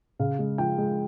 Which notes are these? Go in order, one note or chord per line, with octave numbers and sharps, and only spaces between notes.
C#3 F5
G#3
F3 G5
G#3